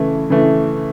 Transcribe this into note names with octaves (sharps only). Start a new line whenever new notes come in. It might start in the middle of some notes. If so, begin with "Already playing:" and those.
Already playing: C#3 E3 A3 E4
C#3 E3 A3 E4